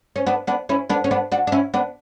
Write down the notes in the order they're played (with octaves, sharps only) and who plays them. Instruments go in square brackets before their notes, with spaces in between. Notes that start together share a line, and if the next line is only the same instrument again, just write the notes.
[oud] C#4
B3 D4
B3 D4
C#4 E4
B3 D4
C#4
B3 D4
D4 F#4
D4
C#4 E4
B3 D4